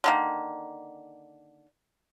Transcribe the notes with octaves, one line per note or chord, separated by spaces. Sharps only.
D3 D#3 A#3